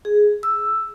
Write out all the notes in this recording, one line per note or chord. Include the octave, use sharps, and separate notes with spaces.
G#4
E6